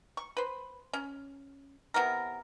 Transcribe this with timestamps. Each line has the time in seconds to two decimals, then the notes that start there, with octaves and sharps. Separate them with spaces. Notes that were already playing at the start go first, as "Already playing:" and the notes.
0.17 C#6
0.37 B4 C5
0.93 C#4
1.94 C3 B3 E4 A#4